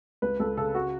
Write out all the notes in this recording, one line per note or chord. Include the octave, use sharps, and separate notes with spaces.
C#2 B4
C#2 A4
C#3 A4
F#4